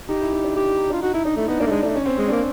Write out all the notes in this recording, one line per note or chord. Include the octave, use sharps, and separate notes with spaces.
D#4 G4
E4
D#4
D4
D#4 G4
E4
D#4
D4 F4
D#4 F#4
D#4 E4
D4 D#4
A3 E4
B3 D#4
A#3 D4
A3
G#3 D4
A3 D4
C#4
C4
G#3 C#4
A#3 D4